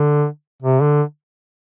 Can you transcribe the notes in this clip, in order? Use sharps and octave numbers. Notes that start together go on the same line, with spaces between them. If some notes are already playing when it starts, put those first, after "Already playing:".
Already playing: D3
C3
D3